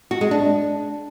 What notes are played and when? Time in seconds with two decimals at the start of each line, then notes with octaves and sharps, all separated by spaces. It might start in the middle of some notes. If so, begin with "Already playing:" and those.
0.11 F#4
0.21 G#3
0.31 D4